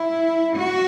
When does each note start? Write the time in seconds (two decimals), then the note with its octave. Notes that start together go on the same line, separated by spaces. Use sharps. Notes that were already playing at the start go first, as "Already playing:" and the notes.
Already playing: E4
0.56 F#4